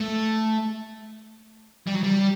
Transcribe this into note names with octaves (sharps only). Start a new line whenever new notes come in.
A3
G3
F#3
G3